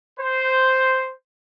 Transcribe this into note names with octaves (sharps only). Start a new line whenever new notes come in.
C5